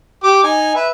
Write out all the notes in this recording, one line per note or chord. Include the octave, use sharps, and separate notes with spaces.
G4 D6
D#4 G#5
B4 E5